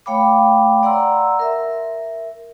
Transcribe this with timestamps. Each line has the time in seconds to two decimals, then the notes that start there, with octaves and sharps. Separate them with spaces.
0.06 A3 C#5 F5 G5 B5 D6
0.83 D5 F#5 A#5 C6 E6
1.39 A#4 E5